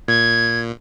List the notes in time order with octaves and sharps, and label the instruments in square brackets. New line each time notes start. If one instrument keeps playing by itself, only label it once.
[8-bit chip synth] A#2 [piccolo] G#6